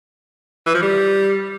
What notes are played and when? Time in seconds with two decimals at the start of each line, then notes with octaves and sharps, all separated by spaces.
0.67 E3
0.74 F3
0.82 G3